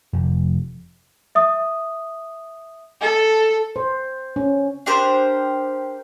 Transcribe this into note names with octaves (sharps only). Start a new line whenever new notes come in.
F1
E5 D#6
A4
C5
C#4
D4 G4 A#4 C5